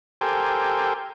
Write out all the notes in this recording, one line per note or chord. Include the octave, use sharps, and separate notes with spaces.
G4 A4 A#4 C5 G5 G#5